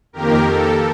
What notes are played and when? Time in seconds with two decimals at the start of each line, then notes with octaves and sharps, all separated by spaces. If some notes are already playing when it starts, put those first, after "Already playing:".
0.13 F2 D#3 A#3 G4 A#4
0.46 A4